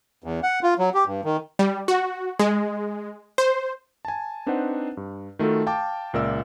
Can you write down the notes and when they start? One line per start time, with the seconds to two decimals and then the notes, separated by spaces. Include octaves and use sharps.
0.24 E2
0.43 F#5
0.63 F4
0.79 F#3
0.94 G4
1.06 G2
1.24 D#3
1.59 G3
1.88 F#4
2.39 G#3
3.38 C5
4.05 G#5 A5
4.46 C4 D4 D#4 B4 C5 F#5
4.97 G2
5.39 D#3 A3 F4 F#4 A4
5.66 F5 G5 A5 D6
6.14 C#2 A#2 A#4 D5 E5 E6